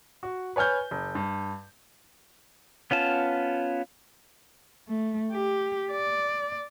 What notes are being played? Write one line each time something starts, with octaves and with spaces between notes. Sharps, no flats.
F#4
B4 C#5 G#5 F6 G6
F#1
G2
B3 C#4 F4 A5
A3
G4
D5